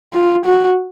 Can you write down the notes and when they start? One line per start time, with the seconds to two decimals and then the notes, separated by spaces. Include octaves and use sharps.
0.14 F4
0.45 F#4